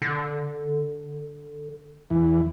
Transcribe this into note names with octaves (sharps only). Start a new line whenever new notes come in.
D3
E2 E3